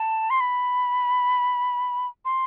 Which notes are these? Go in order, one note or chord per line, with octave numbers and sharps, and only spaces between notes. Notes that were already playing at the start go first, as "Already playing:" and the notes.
Already playing: A5
C6
B5
C6